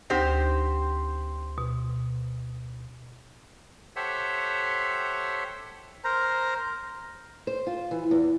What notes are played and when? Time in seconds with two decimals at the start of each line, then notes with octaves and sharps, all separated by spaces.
0.10 D2 C4 D#4 G4 C5 A#6
1.58 B2
3.96 G4 A4 C5 C#5 E5 F#5
6.04 A#4 C5 A#5
7.47 C5
7.67 F4
7.91 E3
8.11 E2